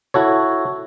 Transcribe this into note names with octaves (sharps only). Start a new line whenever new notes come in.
E4 F#4 A4 C#5